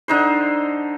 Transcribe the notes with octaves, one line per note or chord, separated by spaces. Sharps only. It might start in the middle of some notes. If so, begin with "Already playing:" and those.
D3 D#4 C5